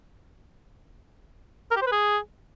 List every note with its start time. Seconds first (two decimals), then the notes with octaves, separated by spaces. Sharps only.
1.71 A#4
1.76 G4
1.82 C5
1.87 B4
1.92 G#4